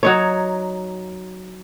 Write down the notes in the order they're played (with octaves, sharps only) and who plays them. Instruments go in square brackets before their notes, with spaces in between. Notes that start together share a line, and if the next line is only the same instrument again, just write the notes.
[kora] F#3 D#4 C#5